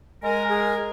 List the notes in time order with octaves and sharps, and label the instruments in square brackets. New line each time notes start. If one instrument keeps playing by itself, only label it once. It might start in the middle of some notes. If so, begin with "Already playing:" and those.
[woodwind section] G#3 A#4 [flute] G#5
[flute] G#4